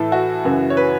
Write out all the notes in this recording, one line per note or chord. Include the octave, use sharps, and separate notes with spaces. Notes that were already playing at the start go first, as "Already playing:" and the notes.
Already playing: A2 E3 A4
F#4
F#2 C#3 E3
C#5
B4